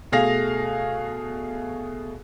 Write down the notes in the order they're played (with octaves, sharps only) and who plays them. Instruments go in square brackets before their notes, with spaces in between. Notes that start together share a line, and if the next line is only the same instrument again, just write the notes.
[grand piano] B2 A3 G#4 F5 A#6 F7